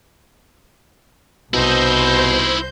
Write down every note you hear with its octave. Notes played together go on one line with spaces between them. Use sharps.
C2 B2 D#4 E4 C5 G6